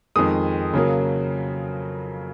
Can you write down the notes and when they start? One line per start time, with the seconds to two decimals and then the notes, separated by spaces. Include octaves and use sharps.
0.16 F2 D#3 G#3 D#6
0.73 C#3 F#3 A#3